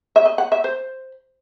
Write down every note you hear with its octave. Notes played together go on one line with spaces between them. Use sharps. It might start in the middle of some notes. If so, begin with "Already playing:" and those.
E5
D#5
F#5
E5
C5